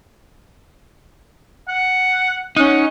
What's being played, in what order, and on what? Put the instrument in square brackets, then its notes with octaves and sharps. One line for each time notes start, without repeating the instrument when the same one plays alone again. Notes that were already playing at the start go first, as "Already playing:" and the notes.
[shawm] F#5
[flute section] C#4 [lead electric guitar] D#4 [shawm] F#5